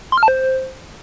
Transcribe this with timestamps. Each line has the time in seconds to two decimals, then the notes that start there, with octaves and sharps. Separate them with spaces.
0.12 C6
0.18 F6
0.23 A5
0.28 C5